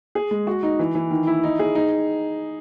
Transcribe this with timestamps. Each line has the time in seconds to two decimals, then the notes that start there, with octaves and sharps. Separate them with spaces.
0.15 G#4
0.31 G#3
0.47 F#4
0.63 D#4
0.79 E3
0.95 E3
1.10 D#3
1.27 E4
1.43 D#4
1.59 G#4
1.75 D#4